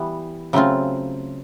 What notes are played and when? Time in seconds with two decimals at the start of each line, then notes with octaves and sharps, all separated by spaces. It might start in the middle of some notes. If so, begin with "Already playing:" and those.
Already playing: E3 G3 B3
0.53 C#3 F#3 A3 C4 F4